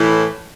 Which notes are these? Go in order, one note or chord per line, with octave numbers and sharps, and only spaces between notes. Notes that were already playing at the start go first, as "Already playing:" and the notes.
Already playing: A2 E3